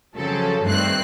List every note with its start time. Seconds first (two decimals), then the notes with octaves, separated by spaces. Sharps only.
0.17 C#3 F3 F#3 C4 A4
0.64 G2 D#3 A3 C4 F#6 C7